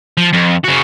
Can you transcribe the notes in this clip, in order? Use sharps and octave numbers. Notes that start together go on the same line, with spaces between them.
F3
F2
C#3 F#4